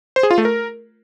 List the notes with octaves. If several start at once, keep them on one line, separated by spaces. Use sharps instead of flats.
C5
G#4
F4
A3
A#4